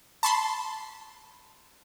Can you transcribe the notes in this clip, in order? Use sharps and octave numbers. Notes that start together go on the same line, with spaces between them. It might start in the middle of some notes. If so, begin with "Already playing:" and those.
A5 B5 C6